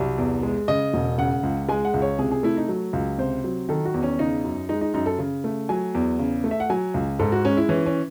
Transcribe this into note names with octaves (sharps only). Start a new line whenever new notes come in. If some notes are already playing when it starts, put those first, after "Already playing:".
Already playing: C2 F#3
E2
G#3
C#3 D#5
E1
C#3 F#5
C#2
G#3 G#5
F#5
C#2
C#5
C3 G#4
G#4
A3 E4
D#4
F#3
C#2
C3 C5
F#3
D#3 A4
F#4
E2
C#4
C#3 D#4
F#2
G#3 D#4
D#4
F#2 D#4
A4
C#3
A3
F#3 G#5
E2
C#3
A3
E5
F#5
F#3 G#5
C#2
G#2 A4
F#4
G#3 C#4
E4
E3 C#4
C#4